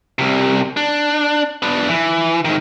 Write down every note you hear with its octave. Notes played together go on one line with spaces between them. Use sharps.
C2 C3
D4
B3 D4
E3
G#2 D#3